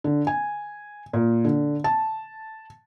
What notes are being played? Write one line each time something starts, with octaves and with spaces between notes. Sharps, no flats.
D3
G#5
A#2
D3
A5